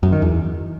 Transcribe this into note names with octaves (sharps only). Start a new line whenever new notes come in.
F#2
D#3
E2